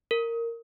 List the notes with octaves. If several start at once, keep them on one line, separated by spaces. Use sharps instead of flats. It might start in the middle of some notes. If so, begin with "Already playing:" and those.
A#4